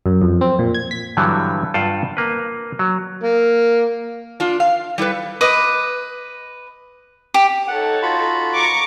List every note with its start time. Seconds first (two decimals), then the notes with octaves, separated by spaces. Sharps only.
0.06 F#2
0.22 F2
0.41 C4
0.59 A#2
0.74 G#6
0.91 B6
1.17 G2 D3 E3 F#3 G3
1.74 G2 F4 F#5 G5 A5
2.17 A#3 B4
2.79 F#3
3.23 A#3
4.40 D4 F4
4.60 F5
4.98 G3 E4 A4 B4
5.41 B4 D#5 D6
7.34 G4
7.68 D#4 A4 C#5 F#5
8.02 F4 F#4 B5
8.55 A#5 C#6 D6